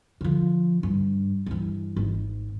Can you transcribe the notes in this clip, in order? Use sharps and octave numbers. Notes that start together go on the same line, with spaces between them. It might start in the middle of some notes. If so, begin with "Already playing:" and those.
D3 F3
G2
G2 E3
G#1